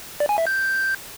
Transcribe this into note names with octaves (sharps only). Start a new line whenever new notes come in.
D5
G#5
E5
G6